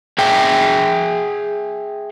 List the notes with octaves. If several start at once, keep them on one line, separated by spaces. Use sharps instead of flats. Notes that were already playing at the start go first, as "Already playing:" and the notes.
G#4 E5 G5